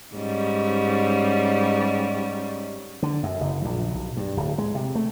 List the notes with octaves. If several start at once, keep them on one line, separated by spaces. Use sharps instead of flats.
G#2 G3 C#4
D3
F#2
F#1
A#1
B1
G2
D1
G#3
C3
A3